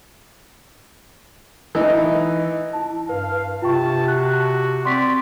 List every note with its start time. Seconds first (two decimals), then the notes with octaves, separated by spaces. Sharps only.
1.75 E3 D#4
2.73 E4 A5
3.09 G2 B4 F5
3.62 C3 F4 G5 A5 C#6
4.08 F#4 F#6
4.85 C4 D5 C6 C#6 B6